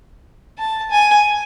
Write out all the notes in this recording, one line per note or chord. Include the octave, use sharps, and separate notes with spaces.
A5
G#5